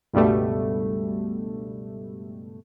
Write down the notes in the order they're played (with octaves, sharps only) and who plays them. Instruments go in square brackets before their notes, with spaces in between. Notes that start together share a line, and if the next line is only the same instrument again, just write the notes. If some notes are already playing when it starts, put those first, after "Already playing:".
[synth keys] C#2 G2 B2 G3 A3